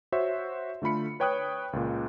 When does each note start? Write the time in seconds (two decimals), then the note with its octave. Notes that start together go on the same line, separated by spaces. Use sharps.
0.12 F#4 C5 C#5 E5
0.82 D3 A3 F4 B5 C#7
1.20 B4 C#5 G5 B5 D#6 F#6
1.73 C#2 A#2